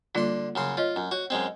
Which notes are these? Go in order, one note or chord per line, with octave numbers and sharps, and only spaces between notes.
D3 G3 A#3 F4 C6
F#2 C#3 C6
F4 C#5 D#5
F#2
F#4 C#5
F#2 G#3 C4